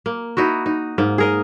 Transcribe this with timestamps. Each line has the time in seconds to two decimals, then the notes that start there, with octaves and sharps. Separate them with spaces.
0.06 A#3
0.37 D#4 E4 F#4
0.66 D#4
0.98 G#2 A#3
1.18 G#4 A#4 D#5